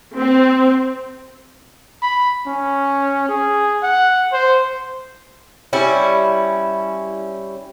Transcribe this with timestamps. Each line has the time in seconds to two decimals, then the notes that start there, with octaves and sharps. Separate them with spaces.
0.18 C4
2.02 B5
2.46 C#4
3.28 G#4
3.83 F#5
4.32 C5
5.73 G3 C#4 E4